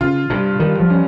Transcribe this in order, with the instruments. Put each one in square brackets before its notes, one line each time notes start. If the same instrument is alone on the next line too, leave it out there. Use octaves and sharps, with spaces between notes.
[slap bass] C#3 [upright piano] F4
[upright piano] G2 [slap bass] C3
[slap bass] D#3 [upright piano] G3
[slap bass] F3
[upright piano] C#4